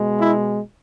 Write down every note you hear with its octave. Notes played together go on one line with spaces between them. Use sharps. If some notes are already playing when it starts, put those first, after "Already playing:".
Already playing: B2 G#3
E4